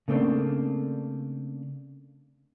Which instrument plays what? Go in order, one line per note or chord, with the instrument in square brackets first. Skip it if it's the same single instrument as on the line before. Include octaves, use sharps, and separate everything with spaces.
[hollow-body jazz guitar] C#3 A3 A#3 C4 D4